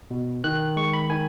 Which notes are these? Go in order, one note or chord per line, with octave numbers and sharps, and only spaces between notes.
B2
D#3 F#6
G#3 C#6
B5
D#3 G#5